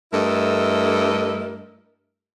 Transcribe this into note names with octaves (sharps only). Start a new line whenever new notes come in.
G2 A3 E4 A4 A#4 D#5